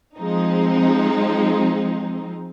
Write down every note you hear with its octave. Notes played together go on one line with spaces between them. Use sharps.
F3 G#3 C4 D#4